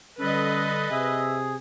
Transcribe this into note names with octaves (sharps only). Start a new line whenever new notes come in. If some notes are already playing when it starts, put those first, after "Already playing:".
D3 G3 C#4 A4 B4 D#5
C3 G#4 E5